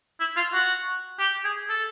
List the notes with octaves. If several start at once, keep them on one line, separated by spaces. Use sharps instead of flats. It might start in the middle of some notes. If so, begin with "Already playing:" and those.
E4
F4
F#4
G4
G#4
A4